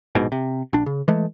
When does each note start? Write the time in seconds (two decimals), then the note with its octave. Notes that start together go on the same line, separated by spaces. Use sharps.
0.15 A#1 G#2 B2
0.32 C3
0.73 A#1 D4
0.86 C#3
1.08 E3 G#3 A3